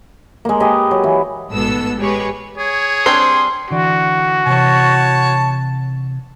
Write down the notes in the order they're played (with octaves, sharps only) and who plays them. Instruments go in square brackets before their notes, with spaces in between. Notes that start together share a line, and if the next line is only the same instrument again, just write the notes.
[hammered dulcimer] G#3 A#3
G4 G#4 B4 D#5
F#3
E3
[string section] A1 G#2 B2 B3 A4 E6
G#3 G4 G#4 B4 C#5
[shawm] G#4 [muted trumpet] C#5
[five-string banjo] G3 C4 D4 [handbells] C6 C7
[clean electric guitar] D3 E3 D5 [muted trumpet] F#4
[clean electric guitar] C3 E3 [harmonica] C#5 A5